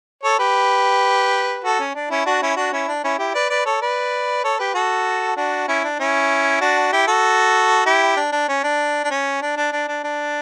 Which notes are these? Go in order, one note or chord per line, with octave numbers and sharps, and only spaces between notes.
A4 C#5
G4 B4
F#4 A4
C#4
D4
C#4 E4
D4 F#4
C#4 E4
D4 F#4
C#4 E4
D4
C#4 E4
E4 G4
B4 D5
B4 D5
A4 C#5
B4 D5
A4 C#5
G4 B4
F#4 A4
D4 F#4
C#4 E4
D4
C#4 E4
D4 F#4
E4 G4
F#4 A4
E4 G4
D4
D4
C#4
D4
D4
C#4
D4
D4
D4
D4
D4